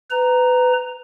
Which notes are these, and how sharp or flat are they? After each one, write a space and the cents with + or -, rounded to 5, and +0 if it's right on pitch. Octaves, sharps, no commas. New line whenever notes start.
B4 +25 A#5 +0